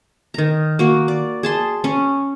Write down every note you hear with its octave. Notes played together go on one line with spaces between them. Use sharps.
D#3 A#5
A#3 F#4
D5
G#4 A5 C6
C#4